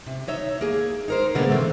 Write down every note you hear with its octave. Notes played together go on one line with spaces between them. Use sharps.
C3
D#4 C#5 E5
A#3 G#4
D#4 A#4 C5
B2 D3 G#3 A#3 B3
C3 E3 A3 C4